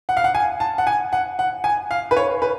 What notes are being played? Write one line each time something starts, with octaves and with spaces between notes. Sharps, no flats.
F#5
F5
F#5
G#5
A5
F#5
G#5
F#5
F#5
G#5
F5
B4
C#5
B4